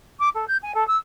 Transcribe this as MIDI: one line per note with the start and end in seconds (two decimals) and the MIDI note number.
0.19 0.29 86
0.34 0.45 69
0.47 0.56 91
0.62 0.72 80
0.74 0.86 69
0.87 0.96 88